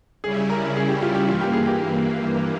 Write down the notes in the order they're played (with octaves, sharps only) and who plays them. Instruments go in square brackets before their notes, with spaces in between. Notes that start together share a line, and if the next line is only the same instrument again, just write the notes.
[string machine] C#3 G3 C#4 E4 [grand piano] G#4
[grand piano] A#4
G#4
G4
F4
G4
[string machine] G2 E3 A#3 [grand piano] F4
[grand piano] G4
G#4
G4